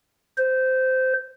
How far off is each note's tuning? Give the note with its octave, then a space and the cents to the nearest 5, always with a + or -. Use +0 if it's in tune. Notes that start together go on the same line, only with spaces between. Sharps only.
C5 -15